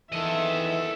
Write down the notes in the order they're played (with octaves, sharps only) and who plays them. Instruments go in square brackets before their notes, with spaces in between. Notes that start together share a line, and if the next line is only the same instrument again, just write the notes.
[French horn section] E2 D#3 E3 [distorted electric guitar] A4 D#5 [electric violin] E5